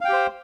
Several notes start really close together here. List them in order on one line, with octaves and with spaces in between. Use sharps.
F5 G5 G4 C5